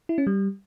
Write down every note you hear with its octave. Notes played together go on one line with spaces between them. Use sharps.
E4
C#4
G3